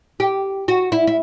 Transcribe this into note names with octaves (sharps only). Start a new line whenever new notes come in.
G4
F#4
E4
E4